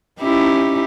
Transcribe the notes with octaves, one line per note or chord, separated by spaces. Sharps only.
C#4 D#4 E4 G4